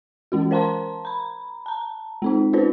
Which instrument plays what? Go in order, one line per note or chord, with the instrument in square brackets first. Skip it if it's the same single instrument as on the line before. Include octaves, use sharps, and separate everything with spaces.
[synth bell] E3 G#3 C#4 F#4
A#4 C5 F5 A5 A#5 C6
A#5 B5
A5 A#5
G#3 C4 D#4
C#4 D#4 F4 A4 B4 C5